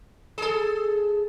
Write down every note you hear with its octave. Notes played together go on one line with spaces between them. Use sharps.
G#4 A4